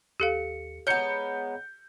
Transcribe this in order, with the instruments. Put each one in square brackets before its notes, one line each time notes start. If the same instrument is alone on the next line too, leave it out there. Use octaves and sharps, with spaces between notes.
[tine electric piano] D#2 C#7 [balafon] G4 A4 F5
[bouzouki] G#3 B3 [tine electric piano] C#5 A#5 [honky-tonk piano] G6 C#7